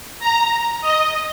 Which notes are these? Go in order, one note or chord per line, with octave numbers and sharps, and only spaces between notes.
A#5
D#5